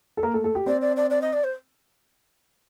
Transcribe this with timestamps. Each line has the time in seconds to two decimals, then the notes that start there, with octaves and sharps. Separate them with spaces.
0.17 A4
0.23 A#3 A#4
0.34 A3 A4
0.44 A3 A4
0.55 G4
0.66 C4 C5 D5
0.81 D5
0.96 D5
1.10 D5
1.21 D#5
1.33 D5
1.44 C5